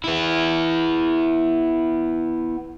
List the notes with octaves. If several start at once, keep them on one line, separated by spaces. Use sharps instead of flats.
B3 E4